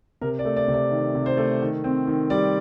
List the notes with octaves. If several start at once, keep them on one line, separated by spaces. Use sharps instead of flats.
C3 A#4
D5
A3
D5
C3
D5
D#3
C3
C5
A3
D#3
C4
D#3
G3 D5